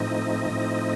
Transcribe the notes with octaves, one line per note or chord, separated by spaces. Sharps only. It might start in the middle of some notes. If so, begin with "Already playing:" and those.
Already playing: A2 F3 A3 C4 D#4 D#5
A2 F3 A3 C4 D#4